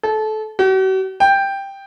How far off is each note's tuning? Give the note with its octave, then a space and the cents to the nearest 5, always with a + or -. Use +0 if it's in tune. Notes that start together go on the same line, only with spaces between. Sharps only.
A4 -25
F#4 +45
G5 +5